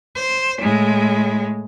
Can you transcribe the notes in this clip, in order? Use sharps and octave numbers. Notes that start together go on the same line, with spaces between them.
C5
A2 G#3